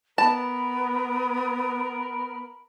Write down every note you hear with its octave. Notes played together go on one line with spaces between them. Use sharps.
B3 A#4 A5 B5